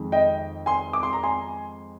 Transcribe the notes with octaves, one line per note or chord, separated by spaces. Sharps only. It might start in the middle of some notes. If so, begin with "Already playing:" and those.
Already playing: F2 D#3 G#3
D#5 G5
G#5 C6
D6
C6
A#5
G#5 C6